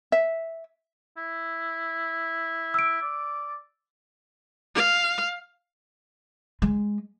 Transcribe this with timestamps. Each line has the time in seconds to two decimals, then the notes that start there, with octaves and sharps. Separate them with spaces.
0.12 E5
1.17 E4
2.74 E6 D7
3.02 D5
4.75 F5
6.62 G#3